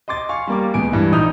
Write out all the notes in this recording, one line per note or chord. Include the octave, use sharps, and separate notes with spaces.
D#5 C6 D6 A6
F5 G#5 C#6
G3 A#3 D6
C#2 G#3 B3 G#5 D7
G2 E3
A#1 A#2 D#4 D#6 G6 F7